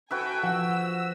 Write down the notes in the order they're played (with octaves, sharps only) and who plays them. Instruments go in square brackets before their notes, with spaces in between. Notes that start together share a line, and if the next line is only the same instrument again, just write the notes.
[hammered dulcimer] F#4 B4 E5 [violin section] A4 G5 G#5
[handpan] F3 [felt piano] F#5 [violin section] E6